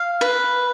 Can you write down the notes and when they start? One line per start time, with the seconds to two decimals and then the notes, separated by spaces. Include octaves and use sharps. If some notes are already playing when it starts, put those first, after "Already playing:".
Already playing: F5
0.21 B4